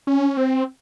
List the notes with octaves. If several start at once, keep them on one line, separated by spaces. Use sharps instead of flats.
C#4
C4